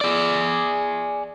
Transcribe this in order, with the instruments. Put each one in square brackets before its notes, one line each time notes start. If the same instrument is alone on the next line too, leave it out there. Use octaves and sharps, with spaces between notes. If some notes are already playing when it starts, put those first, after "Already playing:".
[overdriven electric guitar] G#4 D5